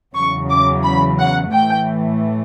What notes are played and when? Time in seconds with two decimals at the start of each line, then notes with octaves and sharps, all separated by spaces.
0.16 E2 C#3 F#3 C#6
0.50 D6
0.84 B5
1.19 F#5
1.52 A2 E3 A3 G5